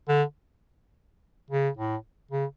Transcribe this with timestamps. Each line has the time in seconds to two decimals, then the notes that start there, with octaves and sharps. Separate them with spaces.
0.08 D3
1.50 C#3
1.77 A2
2.31 C#3